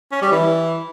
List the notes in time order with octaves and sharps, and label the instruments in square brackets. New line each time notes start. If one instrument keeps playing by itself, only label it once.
[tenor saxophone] C#4
G3
E3